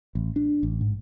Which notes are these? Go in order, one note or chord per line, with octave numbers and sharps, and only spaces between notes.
A1
D4
A1
G#2